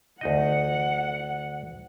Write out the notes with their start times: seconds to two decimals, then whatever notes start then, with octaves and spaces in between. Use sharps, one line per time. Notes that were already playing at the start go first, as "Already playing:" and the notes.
0.21 D2 D#4 D#5 F#5